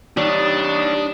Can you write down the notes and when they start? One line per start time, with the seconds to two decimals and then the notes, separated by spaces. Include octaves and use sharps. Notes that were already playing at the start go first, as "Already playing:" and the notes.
0.17 G3 D4 D#4 G4 C#5 D#6